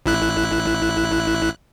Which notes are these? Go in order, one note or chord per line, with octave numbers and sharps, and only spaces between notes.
A1 E4 F#6